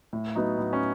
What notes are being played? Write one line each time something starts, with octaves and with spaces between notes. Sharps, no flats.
A2
F#3 B3 D#4
A2
C#4